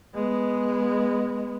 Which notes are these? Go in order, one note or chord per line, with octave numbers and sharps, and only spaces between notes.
G#3 B3